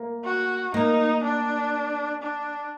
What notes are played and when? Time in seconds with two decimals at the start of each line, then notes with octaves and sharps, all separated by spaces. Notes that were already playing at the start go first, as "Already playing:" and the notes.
Already playing: A#3
0.25 F#4
0.74 A#3 D#4
1.23 D4
2.22 D4